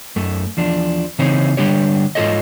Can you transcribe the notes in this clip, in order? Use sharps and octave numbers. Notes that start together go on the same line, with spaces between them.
F#2 A3
E2 F3 D4
C#3 E3 C4 D#4 C#5
D3 G3 D4 G4 C#5
G#2 F4 A4 C#5 D#5